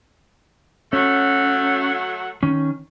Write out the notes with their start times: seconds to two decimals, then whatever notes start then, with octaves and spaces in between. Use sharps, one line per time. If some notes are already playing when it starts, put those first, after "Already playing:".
0.93 F#3 A3 C#4 F#4
2.43 D#3 C#4